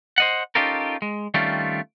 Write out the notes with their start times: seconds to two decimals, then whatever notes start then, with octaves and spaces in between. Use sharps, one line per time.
0.18 C5 D#5 F#5
0.55 C#4 D#4 F4 G4 A4 A#4
1.02 G#3
1.34 D#3 G3 A3 C4 C#4 F4